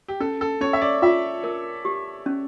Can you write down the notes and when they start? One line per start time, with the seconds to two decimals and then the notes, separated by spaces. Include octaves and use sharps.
0.08 G4
0.20 C#4 A4
0.41 A4
0.61 C#4 C#5
0.73 E5
0.82 D5
1.02 F4 E5
1.44 A#4
1.85 G4
2.26 C#4